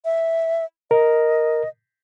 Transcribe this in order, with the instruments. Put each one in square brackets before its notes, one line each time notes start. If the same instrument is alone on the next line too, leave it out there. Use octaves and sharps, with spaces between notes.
[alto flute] E5
[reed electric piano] A#4 [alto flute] D#5